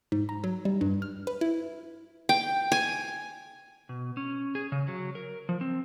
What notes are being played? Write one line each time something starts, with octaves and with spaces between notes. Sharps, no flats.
G#2
A#5
F#3
G3
G2
F6
B4
E4
G5
G#5
B2
C#4
G#4
C#3
F#3
A#4
F3
C4